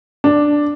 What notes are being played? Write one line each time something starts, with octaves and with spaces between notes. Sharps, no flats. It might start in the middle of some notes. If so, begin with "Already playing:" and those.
D4